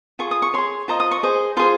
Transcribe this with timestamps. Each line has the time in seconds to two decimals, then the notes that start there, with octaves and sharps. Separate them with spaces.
0.19 F4 G#4 C#6
0.31 D#6
0.42 C#6
0.54 G#4 C#5 C6
0.88 F4 C5 D#5 A#5
1.00 D#6
1.11 C#6
1.23 G#4 C5 D#5
1.57 F4 G#4 C5 C6